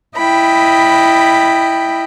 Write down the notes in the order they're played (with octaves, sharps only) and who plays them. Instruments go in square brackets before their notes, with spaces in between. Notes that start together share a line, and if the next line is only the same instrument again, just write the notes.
[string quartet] E4 D#5 G5 B5